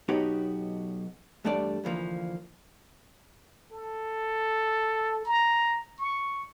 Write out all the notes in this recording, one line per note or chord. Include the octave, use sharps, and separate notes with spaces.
B1 B3 D#4 F#4 G4 C#5
E2 G2 G3 A3 D4 D5
D2 E3 F3 A#3
A4
A#5
C#6